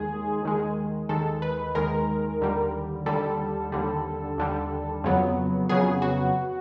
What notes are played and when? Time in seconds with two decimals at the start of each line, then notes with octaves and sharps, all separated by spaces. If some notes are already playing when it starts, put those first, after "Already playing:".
Already playing: D#2 D#3 G#3 G#4
0.43 D#2 D#3 G#3
1.09 D#2 D#3 G#3 A4
1.42 B4
1.75 D#2 D#3 G#3 A#4
2.41 D#2 D3 G3
3.06 D#2 D3 G3 A4
3.72 D#2 D3 G3
4.38 D#2 D3 G3
5.04 F2 C#3 F#3 B3
5.69 F2 C#3 F#3 B3 G#4
6.02 F#4